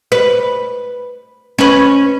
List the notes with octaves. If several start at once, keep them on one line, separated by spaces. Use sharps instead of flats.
B4
C#4 B4